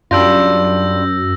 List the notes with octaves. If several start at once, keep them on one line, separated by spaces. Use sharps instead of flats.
F#2 G3 D4 F4 E6 G6 A#6